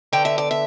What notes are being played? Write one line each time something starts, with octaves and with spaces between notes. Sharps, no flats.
D2 D3 B3 G5
E5
D5
E5